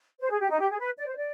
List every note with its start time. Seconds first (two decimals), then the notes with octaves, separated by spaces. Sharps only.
0.20 C5
0.29 G#4
0.39 G4
0.50 D#4
0.59 G4
0.70 G#4
0.79 B4
0.98 D5
1.07 C5
1.16 D5